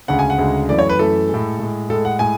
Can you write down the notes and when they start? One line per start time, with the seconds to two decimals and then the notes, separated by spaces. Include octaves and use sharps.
0.08 D2 C#3 G#3 F#5
0.19 G#5
0.30 F#5
0.38 D2 C#3 G#3
0.69 F#2 E3 A3 D5
0.79 C#5
0.89 B4
0.99 F#2 E3 A3 A4
1.29 A2 G#3
1.59 A2 G#3
1.89 A2 G#3 A4
2.05 F#5
2.19 A2 G#3 G#5